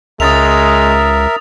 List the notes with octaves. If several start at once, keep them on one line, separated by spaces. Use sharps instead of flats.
C#2 G#3 A#4 E5 D#6 A6 F7